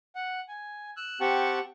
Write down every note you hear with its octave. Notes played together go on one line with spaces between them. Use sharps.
F#5
G#5
E6 F#6
C4 G4 F#5 G5 A5 C#6